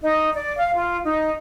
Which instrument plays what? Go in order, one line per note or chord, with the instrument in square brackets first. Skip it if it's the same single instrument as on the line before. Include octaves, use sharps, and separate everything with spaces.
[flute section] D#4
D5
F5
F4
D#4